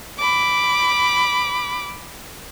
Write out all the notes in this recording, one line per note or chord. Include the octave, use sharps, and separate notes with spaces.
B5 D6